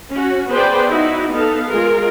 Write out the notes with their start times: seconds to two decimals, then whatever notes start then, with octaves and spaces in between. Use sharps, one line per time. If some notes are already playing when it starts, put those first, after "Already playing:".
0.11 C#4 F#4
0.51 B3 G#4 B4 C5 D5 G5
0.89 D#4 E4 F#4
1.30 B3 D#4 A4 F5
1.67 G#3 F4 A#4